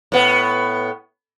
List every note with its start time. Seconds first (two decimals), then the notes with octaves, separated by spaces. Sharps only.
0.12 A2 B3